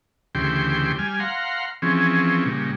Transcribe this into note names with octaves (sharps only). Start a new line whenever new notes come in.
D2 C#3 E3 G4 G5 C6
G3 G#5 F6
F5 F#5 A#5 C6
E3 F3 C4 C#4 G#4
A#2 C#3 G3